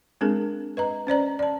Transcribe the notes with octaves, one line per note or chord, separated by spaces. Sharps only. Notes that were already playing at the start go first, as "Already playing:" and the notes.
G#3 C4 D4 G#4 A#4
B4 D#5 A#5
C#4 C5 D5 A#5
D5 A5